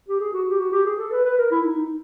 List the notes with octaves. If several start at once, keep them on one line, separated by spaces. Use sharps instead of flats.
G4
G#4
F#4
G4
F#4
G4
G#4
A4
B4
B4
A#4
E4
D#4
D#4